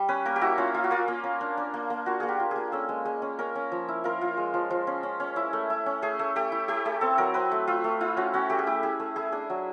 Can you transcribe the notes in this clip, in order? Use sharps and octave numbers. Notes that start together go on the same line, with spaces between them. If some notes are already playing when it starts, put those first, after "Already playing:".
Already playing: G3
C#4 B4
A#3 A#4
G4
E4 F#4
C#4 F4
A#3 F4
F#4
A#3 F4
A#3
C#4
D4
D4
A#3
A#3
F4 F#4
A#3 G#4
G4
F4
A#3 G#4
C#4 A4
G#3
G#3
C#4
C#4 A#4
C#4
F3
E4
F4 A#4
F4
G#3
F3
F3
C#4
C#4
C#4
E4
A3
E4
C#4
A3 G#4
A3
A3 G4
E4
A3 G4
A3 G#4
C4 A4
F#3 A#4
C4 B4
A3
A3 F4
A3
E4 F4
C#4 F#4
C#4 F#4
A3 G4
G#4
E4 G4
E4 G#4
A3
E4 G#4
D4 G#4
F#3